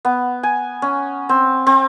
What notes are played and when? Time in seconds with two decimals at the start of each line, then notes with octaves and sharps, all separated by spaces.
0.05 B3
0.43 G#5
0.82 C#4
1.29 C4
1.67 C4